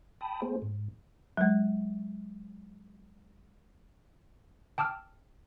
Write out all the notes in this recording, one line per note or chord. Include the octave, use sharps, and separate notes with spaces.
G5 A5 B5 D#6
A3 B3 G#4 C5
G#2
F#3 G#3
G5 A5 D6 E6 F6